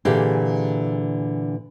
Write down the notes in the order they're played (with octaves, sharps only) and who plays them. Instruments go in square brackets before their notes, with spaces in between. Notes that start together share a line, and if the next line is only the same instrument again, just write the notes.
[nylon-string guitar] A#2 D3 E3 G4 G#4